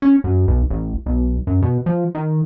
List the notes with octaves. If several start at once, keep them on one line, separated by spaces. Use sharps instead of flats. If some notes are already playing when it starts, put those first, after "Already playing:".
C#4
F#2
B1
A1
B1
F#2
B2
F3
D#3